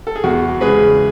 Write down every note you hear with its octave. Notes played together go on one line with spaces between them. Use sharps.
A4
G#4
E2 F#4
C#3 G#3 G#4 B4